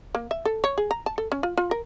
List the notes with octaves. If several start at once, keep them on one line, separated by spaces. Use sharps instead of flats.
A#3
E5
A4
C#5
G#4
A#5
A5
A4
C#4
F4
F4
A#4